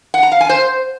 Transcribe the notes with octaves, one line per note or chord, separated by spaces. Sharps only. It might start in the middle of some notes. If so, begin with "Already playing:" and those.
F#5
A#5
F5
G#5
C5